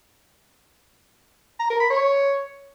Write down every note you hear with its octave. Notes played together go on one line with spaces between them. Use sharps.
A#5
A#4
B5
C#5